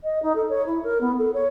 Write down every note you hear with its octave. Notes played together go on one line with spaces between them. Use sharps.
D#5
D#4
A4
C#5
E4
A#4
B3
A4
C#5